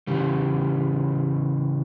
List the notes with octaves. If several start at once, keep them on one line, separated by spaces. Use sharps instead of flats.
C#3 E3 G3